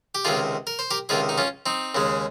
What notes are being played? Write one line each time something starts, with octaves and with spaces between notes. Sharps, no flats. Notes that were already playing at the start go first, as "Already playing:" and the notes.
G4
C#2 C3 D#3 F4 G#4
A#4
C5
G4 A#4
C#2 C3 D#3 F4 G#4
D#4
C#4 F4
C4 D#4
D#2 C#3 G#3